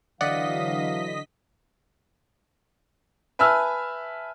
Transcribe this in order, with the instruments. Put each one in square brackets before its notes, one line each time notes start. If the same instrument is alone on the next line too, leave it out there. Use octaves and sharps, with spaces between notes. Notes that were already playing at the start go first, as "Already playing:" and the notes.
[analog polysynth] D3 D#5 B6 [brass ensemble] E3 F#3 [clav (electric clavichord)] D5 F#5 [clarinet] F5
[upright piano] B4 E5 G#5 A5 E6 F6